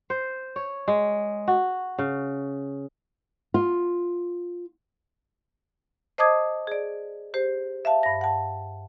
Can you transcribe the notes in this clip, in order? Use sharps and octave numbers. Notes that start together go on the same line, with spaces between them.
C5
C#5
G#3
F#4
C#3
F4
C5 D#5 A5 D6 D#6 G#6
G#4 D5
G4 C5
E5 F5 A5
G2 A#6
F#5 A5